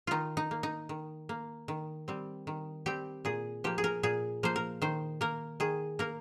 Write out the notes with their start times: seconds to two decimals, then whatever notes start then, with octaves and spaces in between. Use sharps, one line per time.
0.07 D#3 D#4 F4
0.37 D#4
0.51 A#3
0.63 D#4
0.89 D#3
1.29 A#3
1.68 D#3
2.08 G3 C4
2.47 D#3
2.86 G3 C4 G4
3.25 A#2 G#4
3.64 F3 A#3 G4
3.78 G#4
3.84 A#4
4.03 A#2 G#4
4.43 F3 A#3 C5
4.56 A#4
4.82 D#3 C5
5.21 A#3 A#4
5.60 D#3 G#4
5.99 A#3 A#4